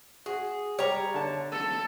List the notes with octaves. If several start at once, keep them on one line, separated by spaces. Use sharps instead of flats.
F#4 G#4
G3 G4 C#5 A#5
D3 A5
A4